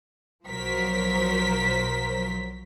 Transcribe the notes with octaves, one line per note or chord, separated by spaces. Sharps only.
B1 F3 F#3 A#4 C5 B6